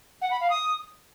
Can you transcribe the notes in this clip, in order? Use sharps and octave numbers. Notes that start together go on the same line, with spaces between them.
F#5
B5
F5
D#6